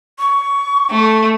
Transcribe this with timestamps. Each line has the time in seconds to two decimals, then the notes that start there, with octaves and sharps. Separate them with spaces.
0.19 C#6
0.91 A3